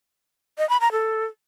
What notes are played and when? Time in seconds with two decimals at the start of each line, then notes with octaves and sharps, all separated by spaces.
0.58 D#5
0.69 B5
0.81 A#5
0.92 A4